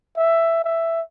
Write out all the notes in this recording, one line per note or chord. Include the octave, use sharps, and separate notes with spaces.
E5
E5